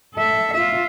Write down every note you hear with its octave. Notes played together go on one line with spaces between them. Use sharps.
A4 E5
F4 E5